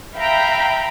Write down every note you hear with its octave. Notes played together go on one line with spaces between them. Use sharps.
E5 F5 G5 A#5 B5